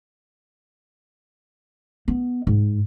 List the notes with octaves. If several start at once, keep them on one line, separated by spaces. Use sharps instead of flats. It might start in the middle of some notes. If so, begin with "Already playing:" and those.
B3
G#2